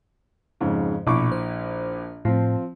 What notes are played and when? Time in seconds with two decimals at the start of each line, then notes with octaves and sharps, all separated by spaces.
0.61 F2 G#2 C#3
1.07 A#1 B2 E4 C#6 D6
1.32 C5
2.25 A2 F3 C4